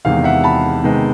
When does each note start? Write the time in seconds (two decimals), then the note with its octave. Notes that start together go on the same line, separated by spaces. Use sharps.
0.05 E2 C3 D#3 G#3 F5
0.24 E5 F#5
0.44 A5 B5
0.84 C3 D#3 G#3 B3